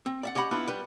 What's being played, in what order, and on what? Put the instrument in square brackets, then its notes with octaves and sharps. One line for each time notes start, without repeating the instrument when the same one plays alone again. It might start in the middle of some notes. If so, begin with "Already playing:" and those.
[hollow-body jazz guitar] C4
D5 E5 F#5
C#4 G4 D#5 F#5 B5
B3 D4 E4 F4
G3 B4